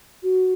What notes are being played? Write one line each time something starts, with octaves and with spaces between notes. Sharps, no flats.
F#4